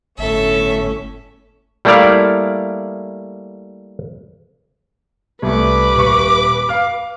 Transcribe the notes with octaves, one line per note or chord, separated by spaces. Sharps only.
G1 A2 C#4 A4 E5
G3 A3 A#3 E4 D5 F5
C2 A3 B4 D6
D#1 C#6
F5 F6